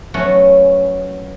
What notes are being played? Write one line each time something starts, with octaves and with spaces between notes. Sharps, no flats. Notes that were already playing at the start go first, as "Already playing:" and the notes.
F#3 A3 B3 C#4